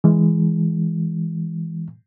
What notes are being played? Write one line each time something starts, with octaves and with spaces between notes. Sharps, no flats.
E3 G#3